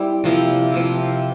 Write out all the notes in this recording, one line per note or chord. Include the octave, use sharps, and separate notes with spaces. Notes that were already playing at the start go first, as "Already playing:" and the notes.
Already playing: G3 C4 E4
C3 F3 A#3 E4
C3 F3 A#3 E4